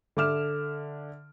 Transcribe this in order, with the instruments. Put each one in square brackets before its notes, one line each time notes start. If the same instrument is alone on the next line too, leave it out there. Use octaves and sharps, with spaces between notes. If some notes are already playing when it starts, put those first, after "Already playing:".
[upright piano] D3 E5 D6 F6 E7